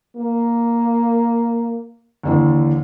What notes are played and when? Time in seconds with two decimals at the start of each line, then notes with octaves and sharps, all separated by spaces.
0.17 A#3
2.23 D#2 D3 E3